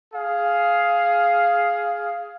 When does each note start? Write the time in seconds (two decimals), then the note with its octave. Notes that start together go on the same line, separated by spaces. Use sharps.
0.14 G#4 F5